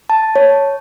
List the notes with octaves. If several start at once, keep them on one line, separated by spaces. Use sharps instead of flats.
A5
C#5